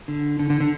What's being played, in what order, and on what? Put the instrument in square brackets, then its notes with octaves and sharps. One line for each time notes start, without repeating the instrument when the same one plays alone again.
[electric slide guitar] D3
D3
D3
D3